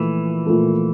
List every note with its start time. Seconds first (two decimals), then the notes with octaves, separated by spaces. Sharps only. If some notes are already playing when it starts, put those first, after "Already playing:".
Already playing: A#2 E3 F3 A3
0.46 A#2 F3 A3